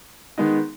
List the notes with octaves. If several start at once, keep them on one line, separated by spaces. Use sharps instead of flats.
D#3 G#3 B3 D#4